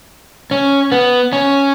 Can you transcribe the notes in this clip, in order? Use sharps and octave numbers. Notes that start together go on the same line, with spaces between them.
C#4
B3
C#4